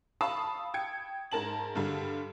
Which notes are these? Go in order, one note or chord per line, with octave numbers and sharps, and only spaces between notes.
F5 A5 B5 C#6 D#6 E6
G5 G#6 C#7
G#2 A#4 A5 F#7
G2 D3 G3